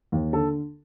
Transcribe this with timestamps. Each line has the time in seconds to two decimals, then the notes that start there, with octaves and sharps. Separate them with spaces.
0.12 D#2
0.33 D3 A4